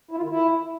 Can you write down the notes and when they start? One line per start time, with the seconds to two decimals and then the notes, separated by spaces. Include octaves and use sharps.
0.11 E4
0.17 F4
0.23 D#3
0.29 E4